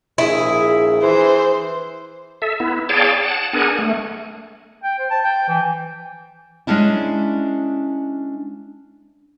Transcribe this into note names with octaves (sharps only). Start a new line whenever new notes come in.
A#1 E4 G#4
E3 C5
A4 E5
B3 E4
G#4 C#5 D5 F5 G5 A5
F#5 A5
B3 D4 G#4 A#4 F#5 G#5
A3
G5
C5
A5
G5
E3
G#3 A#3 C#4 D4 E4